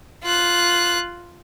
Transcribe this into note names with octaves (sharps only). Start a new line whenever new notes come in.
F4 F#6